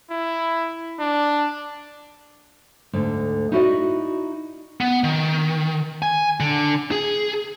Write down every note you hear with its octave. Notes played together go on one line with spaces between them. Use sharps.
E4
D4
D2 G#2 D3
D#4 E4 F#4 A#4 D5 D#5
B3
D#3
G#5
D3
G#4